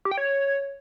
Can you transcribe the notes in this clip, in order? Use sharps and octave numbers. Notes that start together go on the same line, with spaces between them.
G4
G5
C#5